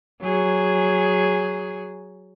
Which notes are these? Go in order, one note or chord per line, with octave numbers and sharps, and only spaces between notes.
F#3 G#4